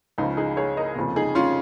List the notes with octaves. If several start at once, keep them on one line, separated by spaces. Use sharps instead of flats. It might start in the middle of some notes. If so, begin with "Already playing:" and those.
C#2 C#3 F3 D#4
D#4 G#4
G#4 C#5
A#4 D#5
F1 D#2 C#3 F3
D#4 G#4
C#4 F4